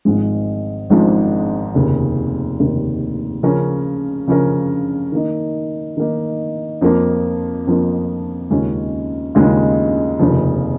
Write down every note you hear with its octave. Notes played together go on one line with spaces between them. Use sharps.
G#1 G#2 F3 G#3
G#1 G#2 F3 G#3
F1 D#2 C#3
F1 D#2 C#3
C#3 F3 C#4 A#4
C#3 F3 C#4 A#4
D#3 A#3 D#4
D#3 A#3 D#4
F2 F3 A#3
F2 F3 A#3
D#2 C#3 G#3 C#4 F4
D#2 C#3 G#3 C#4 F4
F1 D#2 C#3 F3